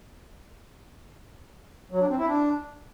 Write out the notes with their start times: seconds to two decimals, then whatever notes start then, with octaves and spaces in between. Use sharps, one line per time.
1.92 F#3
2.01 D4
2.10 C4
2.19 E4
2.28 D4